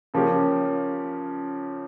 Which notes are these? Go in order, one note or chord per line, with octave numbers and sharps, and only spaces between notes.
C#3 F3 A#3 C#4 G4